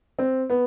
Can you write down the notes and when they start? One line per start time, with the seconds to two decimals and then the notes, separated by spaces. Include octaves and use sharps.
0.19 C4
0.50 B3